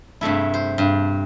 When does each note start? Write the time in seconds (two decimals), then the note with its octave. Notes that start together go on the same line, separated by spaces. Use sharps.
0.21 G2 C3 A3 E4
0.54 C5
0.78 G2